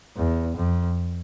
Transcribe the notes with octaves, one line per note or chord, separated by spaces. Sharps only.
E2
F2